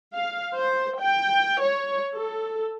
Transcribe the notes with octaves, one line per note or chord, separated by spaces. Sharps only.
F5
C5
G5
C#5
A4